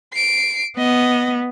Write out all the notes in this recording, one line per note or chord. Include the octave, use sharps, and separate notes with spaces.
C7 D7
B3 D#5